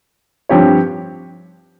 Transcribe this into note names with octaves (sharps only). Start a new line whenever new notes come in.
G2 F3 C4 G4 C#5